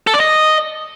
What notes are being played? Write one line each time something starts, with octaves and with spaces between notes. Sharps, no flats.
A4
D5
D#5